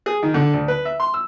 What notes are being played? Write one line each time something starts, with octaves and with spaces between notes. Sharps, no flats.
G#4
D#3
D3
D2
B4
E5
C6
E6